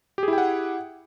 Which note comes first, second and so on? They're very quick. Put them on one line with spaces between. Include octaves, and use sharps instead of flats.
G4 G#4 E4 G5 F#5